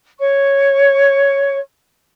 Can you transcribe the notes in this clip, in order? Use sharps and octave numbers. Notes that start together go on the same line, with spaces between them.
C#5 C#6